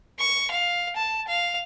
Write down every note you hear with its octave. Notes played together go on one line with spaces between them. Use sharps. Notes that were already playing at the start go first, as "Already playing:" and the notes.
C#6
F5
A5
F5